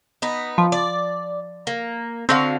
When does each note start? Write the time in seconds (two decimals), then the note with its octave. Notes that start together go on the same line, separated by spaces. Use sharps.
0.22 B3 D#4
0.58 F3
0.72 D5
1.67 A#3
2.29 D3 C4 F#4 F5